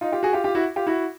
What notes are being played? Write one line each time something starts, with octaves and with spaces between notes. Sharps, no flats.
D#4 F4
F4 G4
F#4 G#4
F4 G4
F4 G4
E4 F#4
F4 G4
E4 F#4